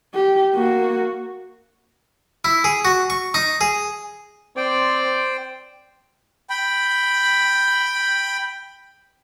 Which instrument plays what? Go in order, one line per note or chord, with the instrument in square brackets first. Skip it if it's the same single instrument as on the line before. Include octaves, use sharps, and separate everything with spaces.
[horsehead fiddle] G4
A#3 F#4
[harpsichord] E4
G#4
F#4
C#6
D#4
G#4
[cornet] C4 [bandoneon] C5 G5 [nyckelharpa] D5
[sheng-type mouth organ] G5 B5